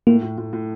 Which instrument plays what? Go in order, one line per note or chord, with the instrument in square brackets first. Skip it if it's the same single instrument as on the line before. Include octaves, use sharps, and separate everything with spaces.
[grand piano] A2 [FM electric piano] A#3
[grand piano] A2
A2
A2